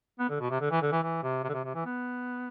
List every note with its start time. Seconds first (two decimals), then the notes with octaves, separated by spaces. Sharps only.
0.19 B3
0.29 D3
0.40 B2
0.50 C3
0.61 D3
0.71 E3
0.82 D3
0.92 E3
1.02 E3
1.23 C3
1.43 C3
1.49 D3
1.54 C3
1.64 C3
1.74 E3
1.85 B3